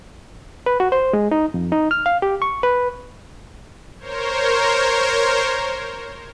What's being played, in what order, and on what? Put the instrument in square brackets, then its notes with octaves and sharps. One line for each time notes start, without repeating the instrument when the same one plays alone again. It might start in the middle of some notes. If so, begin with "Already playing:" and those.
[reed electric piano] B4
F#4
C5
G#3
D#4
F2
D#4
F6
F5
G4
C#6
B4
[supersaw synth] A#4 C5 C#5